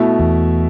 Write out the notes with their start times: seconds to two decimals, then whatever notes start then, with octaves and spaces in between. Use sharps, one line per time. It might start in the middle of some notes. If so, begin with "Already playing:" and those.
Already playing: B2 A3 E4
0.19 E2